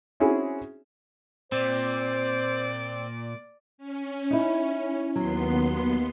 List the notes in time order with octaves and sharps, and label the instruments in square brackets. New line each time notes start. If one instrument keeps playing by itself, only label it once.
[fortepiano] C4 C#4 E4 F#4 G#4
[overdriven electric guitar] A#2 [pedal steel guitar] C4 [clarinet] C5 [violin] D5
[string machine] C#4
[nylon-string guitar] D#4 E4
[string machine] D#2 B3 C6 [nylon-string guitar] F#3